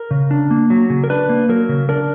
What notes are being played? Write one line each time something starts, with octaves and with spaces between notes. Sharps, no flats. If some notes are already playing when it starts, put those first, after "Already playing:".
Already playing: A#4
C#3
D4
A#3
F#3
C#3
A#4
D4 B4
A#3
F#3 A#4
C#3
D4 A#4